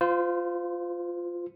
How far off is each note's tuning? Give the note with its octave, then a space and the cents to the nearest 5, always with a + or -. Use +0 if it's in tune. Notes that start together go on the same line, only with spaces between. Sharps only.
F4 +0 C5 -30